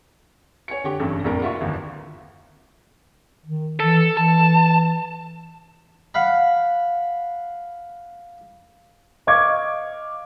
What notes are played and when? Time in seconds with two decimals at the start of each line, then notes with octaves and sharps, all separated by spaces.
0.68 C#5 G#5 C#7
0.84 D3 G4 C#6
1.00 A1 G2 C3 A4
1.24 A#1 A2 C3 A#3 A#4
1.42 F4 F#4 E5 F5 C#6
1.61 G1 D#2
3.45 D#3
3.80 E3 A4
4.17 E3 A5
6.14 F5 F#5 B5
9.27 D#5 F5 C#6 D6 G#6